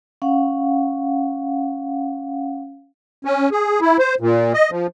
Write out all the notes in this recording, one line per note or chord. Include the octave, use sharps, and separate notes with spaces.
C#4 F5 F#5
C#4
G#4
E4
C5
A#2
D#5
F3